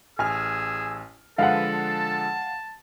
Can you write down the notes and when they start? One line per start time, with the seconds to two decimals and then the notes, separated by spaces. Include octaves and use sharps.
0.19 A1 G#4 G#5 E6 F6
1.38 D3 F3 G#3 A4 B4 F5 F#5
1.70 A5